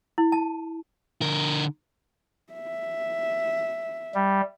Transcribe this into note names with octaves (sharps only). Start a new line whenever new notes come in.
E4
A5
D3 A#4
E5
G3